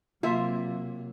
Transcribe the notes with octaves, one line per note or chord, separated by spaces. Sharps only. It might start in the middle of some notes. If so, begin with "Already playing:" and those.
C3 F#3 A#3 F4 E5